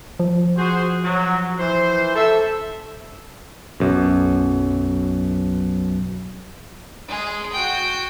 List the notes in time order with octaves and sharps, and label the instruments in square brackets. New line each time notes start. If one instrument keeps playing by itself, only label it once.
[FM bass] F3
[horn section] F#4 G#4 C5
F#3
E3 C5
A4 E5
[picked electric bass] B1 F#2
[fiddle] G#3 G#4
F#4 G5